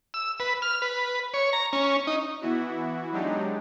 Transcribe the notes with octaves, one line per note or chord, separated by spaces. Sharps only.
E6
B4
F6
B4
C#5
A#5
C#4
D#4
E3 B3 E4 F#4
F#3 G#3 D4 D#4 G4